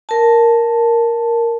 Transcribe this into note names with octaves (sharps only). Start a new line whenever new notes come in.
A#4 A5